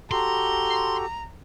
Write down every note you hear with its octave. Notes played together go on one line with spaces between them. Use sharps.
F#4 G4 A4 A#5 C6